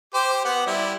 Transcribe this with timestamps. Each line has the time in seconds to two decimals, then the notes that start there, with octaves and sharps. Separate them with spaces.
0.14 G4 C5 D6
0.45 B3 F#5
0.67 G3 E4